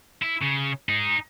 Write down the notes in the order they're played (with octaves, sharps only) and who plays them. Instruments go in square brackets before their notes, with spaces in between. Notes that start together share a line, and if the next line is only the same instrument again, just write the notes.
[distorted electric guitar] E4
C#3
D#4 G#4